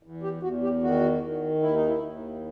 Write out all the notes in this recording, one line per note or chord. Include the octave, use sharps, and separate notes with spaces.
E2
G4
E2 F#4
G4
D#3 F#4
D#3
D#2 E4
D#4
E4
D#2